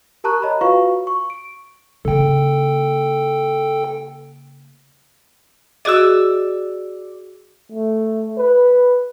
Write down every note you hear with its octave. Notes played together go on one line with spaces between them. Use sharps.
G4 A#4 A5 A#5 C#6 F#6
C#5 D#5 A#5 B5
F4 F#4 B4 F5 C#6
C#6
D7
C#3 A#3 A4 G5
F#4 G#4 D5 D#5 E6
A3
B4